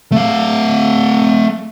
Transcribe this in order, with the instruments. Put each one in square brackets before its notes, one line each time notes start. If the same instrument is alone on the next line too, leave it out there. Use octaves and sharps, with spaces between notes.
[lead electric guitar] A3 F5